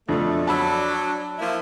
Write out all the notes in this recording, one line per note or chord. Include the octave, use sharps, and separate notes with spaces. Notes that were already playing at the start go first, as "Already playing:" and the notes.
F2 B2 A3 D4
F#3 D4 A5 B5 E6
F3 A#3 E4